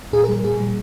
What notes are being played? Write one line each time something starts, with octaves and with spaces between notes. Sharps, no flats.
A#2 G#4
A#4
G3
A#2 G#4
G3